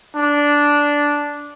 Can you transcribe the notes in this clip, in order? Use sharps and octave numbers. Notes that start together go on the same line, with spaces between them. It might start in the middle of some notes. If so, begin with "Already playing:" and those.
D4